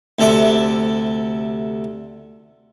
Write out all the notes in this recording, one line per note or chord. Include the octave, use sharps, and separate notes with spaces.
D2 C3 A4 E5 D6